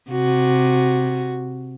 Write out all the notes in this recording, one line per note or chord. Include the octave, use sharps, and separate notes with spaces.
C3 F#4